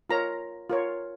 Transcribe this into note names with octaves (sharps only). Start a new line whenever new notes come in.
F4 A#4 C#5 A#5
F4 A#4 C#5